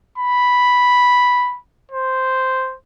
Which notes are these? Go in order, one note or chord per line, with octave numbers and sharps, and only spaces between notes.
B5
C5